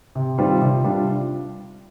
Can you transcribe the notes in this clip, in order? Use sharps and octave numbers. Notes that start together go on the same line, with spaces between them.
C3
D#3 G3 C4 F4
C3
G3 D4 F4